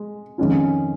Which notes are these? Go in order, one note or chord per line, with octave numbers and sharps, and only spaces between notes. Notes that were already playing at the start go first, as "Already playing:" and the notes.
Already playing: G#3
F2 D#3 G#3 C#4 F4